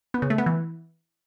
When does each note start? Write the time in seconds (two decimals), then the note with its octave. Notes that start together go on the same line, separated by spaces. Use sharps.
0.14 B3
0.22 C#3
0.30 A3
0.38 B3
0.46 E3